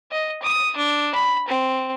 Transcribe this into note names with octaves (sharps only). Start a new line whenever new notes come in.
D#5
D#6
D4
B5
C4